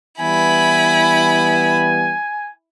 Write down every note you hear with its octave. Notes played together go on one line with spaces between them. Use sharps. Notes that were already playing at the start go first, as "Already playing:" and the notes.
E3 G3 B3 E4 G#5 B5